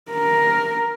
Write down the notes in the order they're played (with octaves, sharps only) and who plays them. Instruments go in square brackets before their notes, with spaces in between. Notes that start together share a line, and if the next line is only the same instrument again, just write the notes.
[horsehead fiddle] A#4